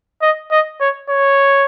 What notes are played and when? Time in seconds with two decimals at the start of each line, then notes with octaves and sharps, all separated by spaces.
0.22 D#5
0.51 D#5
0.80 C#5
1.10 C#5